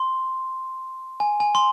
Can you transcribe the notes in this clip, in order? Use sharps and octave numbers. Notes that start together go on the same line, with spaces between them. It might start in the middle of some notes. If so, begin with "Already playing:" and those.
Already playing: C6
G#5
G#5
C6